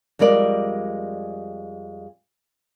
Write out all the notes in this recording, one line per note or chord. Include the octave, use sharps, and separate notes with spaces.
F2 G3 G#3 A#4 D5